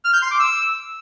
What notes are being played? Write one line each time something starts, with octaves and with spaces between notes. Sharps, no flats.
F6
G6
C6
D6
E6